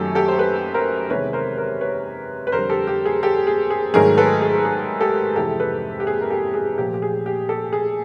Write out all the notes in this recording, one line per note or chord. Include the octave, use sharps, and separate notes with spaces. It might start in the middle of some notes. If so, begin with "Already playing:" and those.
Already playing: F#2 D#3 F#3 A3 G4 A4
G4 A4
C5
A4 B4
A#4 C5
E2 C3 D#3 G#3 B4 C#5
A#4 C5
A#4 C5
B4 C#5
B4
F2 D3 G3 A#4 C5
G4 A4
G4
G#4
G4 A4
G#4
G#4
G#2 D#3 F#3 A3 G#4 A#4
A4 B4
G#4
G#4
G4 A4
F2 C3 E3 G#3 G4 A4
A4 B4
G4
G#4
A#4
G4 A4
G#4
A#2 F3 A3 G4
G4
G#4
G4
G4 A4
G#4